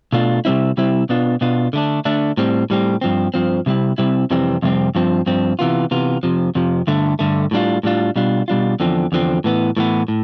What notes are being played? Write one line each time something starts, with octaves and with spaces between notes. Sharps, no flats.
B2 A3 D4 F4
C3 G3 C4 E4
C3 G3 C4 E4
B2 B3 D4 F4
B2 B3 D4 F4
D3 A3 D4
D3 A3 D4
A2 G3 C4
A2 G3 C4
G2 F3 C4
G2 F3 C4
C3 G3 C4 E4
C3 G3 C4 E4
F2 C3 E3 G3 C4
F2 C3 G3 C4
G2 F3 C4
G2 F3 C4
C3 E3 B3 F4
C3 E3 B3 F4
F2 C3 F3
F2 C3 F3
G2 D3 A3
G2 D3 A3
A2 G3 D4 F4
A2 G3 D4 F4
B2 G3 D4 F4
B2 G3 D4 F4
E2 D3 F3 C4
E2 D3 F3 C4
A2 E3 B3
A2 E3 B3
A2